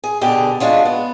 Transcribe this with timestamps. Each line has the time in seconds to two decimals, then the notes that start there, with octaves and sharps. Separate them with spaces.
0.04 G#4
0.21 B2 D3 G4 G#4
0.60 G#3 D4 F4 F#4
0.85 B3